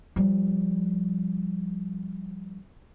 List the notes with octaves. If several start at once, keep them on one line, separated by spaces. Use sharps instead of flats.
F3 G3